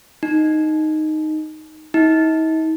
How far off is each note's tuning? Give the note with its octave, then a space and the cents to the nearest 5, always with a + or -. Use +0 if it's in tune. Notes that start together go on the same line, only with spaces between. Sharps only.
D#4 -5
D#4 +45